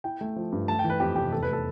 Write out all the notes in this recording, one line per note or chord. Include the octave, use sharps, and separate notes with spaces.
E4 G5
A3
F3
G2
A3 A5
G5
E3
B4
F2 G4
F1 G4
E2 A4
B4
A3 A4